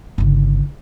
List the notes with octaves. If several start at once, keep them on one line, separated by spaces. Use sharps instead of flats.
G1 C#3